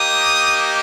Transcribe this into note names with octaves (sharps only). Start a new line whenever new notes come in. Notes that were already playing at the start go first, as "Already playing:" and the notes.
Already playing: A#3 D#4 G4 D#6